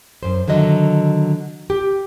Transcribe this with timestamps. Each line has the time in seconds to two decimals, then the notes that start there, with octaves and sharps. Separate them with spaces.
0.23 F#2 C5
0.48 D3 D#3 F#3 D#5 E5
1.70 G4